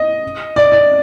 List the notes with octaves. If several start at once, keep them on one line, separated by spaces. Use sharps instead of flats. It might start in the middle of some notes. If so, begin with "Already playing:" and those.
Already playing: D#5
D5
D5